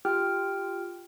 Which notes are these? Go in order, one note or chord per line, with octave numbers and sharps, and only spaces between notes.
F4 G4 G5 F6